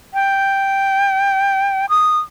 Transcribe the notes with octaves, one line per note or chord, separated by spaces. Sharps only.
G5
D#6